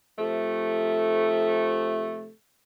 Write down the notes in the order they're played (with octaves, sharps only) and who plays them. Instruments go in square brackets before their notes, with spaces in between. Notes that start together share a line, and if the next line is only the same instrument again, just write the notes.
[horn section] C3 F3 A3